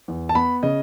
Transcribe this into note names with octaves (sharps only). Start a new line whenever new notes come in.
E2
A5
B3 B5
C#3 D#5